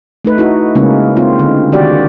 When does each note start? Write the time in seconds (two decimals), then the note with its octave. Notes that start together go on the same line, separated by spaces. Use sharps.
0.25 A3 D#4 B4
0.38 D#4 E4 F#4
0.75 C#3 G#3 A#3 C#4 E4
1.16 A#3 C4 D#4 F4
1.39 D3 C4
1.72 D#3 F#4 G4 D5